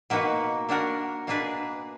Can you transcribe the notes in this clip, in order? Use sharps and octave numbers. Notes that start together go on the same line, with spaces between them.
B2 A#3 D#4 F#4 B4
A#3 D4 F#4 A#4
B2 A#3 D4 G#4 B4